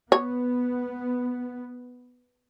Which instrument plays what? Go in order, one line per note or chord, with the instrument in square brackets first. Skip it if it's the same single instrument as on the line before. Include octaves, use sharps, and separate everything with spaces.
[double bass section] B3 [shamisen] C#5